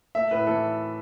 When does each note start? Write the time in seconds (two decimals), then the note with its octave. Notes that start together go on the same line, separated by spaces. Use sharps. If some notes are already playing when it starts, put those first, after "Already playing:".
0.15 A3 E5
0.31 A2 B4
0.47 E3 A4